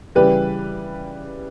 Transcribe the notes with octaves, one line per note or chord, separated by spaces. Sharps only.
C#3 E3 G3 G4 B4